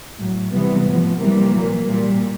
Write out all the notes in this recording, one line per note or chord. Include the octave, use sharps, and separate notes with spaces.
A2 F#3
C3 E3 G3 B3
A2 F3
C3 E3 G3 A#3
A#2 F#3
A#2 G3